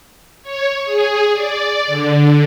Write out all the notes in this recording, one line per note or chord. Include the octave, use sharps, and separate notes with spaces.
C#5
G#4
D5
D3